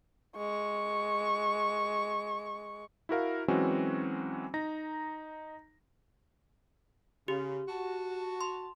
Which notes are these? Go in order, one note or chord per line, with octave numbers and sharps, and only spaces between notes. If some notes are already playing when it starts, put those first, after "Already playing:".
G#3 C#6
E4 F#4 A#4 F5
E3 F#3 G#3 C4 C#4 F#4
D#4 A#5 A#6
C#3 G4
F#4 A5
C6